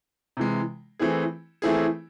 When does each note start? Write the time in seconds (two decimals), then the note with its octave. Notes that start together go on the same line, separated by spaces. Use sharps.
0.37 C3 E3 G#3
0.99 E3 A3 C4 E4 G#4
1.62 E3 A3 C4 E4 G#4